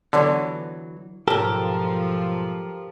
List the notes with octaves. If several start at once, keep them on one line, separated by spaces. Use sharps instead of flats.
D3 E3 F#3 B3
B1 G#2 F3 G4 A4 A#4